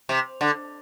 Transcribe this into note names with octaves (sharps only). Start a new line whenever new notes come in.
C3
D3